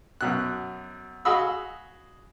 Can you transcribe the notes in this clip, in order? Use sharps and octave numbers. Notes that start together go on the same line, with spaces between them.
F#2 B2 F#6
F#4 G#4 D#5 F5 B5 E6